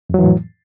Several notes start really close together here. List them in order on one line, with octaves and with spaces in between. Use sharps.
F2 F#3 E3 A2